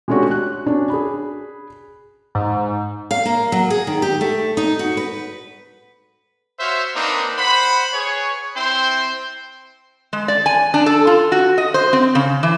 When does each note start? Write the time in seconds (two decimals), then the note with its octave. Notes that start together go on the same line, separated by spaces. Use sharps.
0.08 G#3 A3 C#4 D4 F#4 G4
0.31 F#6
0.66 C#4 D4 F#4
0.90 G#4 B5
2.35 G#2
3.11 F5
3.26 A#3
3.52 F#3
3.70 G#4
3.87 D#3
4.02 G4
4.21 A3
4.57 D#4
4.79 F#4
4.97 B4
6.59 F#4 C5 C#5 E5 F5
6.95 A#3 C4 D4 D#4 B4
7.38 C5 F#5 B5
7.93 G#4 B4 C#5
8.55 C4 E4 C5 G5 C6
10.13 G#3
10.28 D5
10.46 G#5
10.74 D4
10.86 A4
11.07 F4
11.32 F#4
11.58 D#5
11.74 C5
11.93 C4
12.15 C#3
12.43 E3